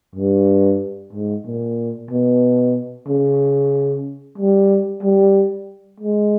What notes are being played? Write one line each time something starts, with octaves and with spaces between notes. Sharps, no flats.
G2
G#2
A#2
B2
C#3
G3
G3
G#3